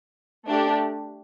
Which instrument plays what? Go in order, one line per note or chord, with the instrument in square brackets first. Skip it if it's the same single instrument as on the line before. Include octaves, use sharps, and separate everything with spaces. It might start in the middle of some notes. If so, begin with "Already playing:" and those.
[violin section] A3 D4 G4